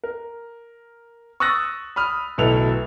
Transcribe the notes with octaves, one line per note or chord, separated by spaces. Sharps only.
A#4
C#6 D#6 E6 F#6 A6 A#6
B5 D#6 F6
D1 B1 E4 A4 B4 F7